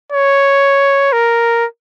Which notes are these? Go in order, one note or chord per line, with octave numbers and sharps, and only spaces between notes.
C#5
A#4